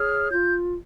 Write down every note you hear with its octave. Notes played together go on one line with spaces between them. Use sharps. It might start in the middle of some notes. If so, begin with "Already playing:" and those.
Already playing: G#4 C#5 F6
F4 G6